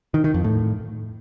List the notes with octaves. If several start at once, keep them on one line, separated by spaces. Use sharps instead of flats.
D#3
D#3
F2
A2